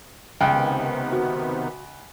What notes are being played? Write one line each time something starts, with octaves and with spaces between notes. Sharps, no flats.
C#2 C3 D#3 B3 G5
F#4